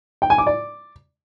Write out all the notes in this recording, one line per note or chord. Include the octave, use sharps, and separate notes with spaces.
G5
G#5
D6
D5